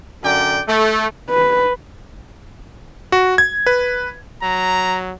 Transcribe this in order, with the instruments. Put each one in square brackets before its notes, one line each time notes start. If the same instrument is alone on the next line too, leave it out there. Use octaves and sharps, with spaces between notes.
[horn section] F#2 D3 D5 G5
A3
[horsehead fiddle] B4
[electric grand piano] F#4
G#6
B4
[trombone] F#3 [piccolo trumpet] A#5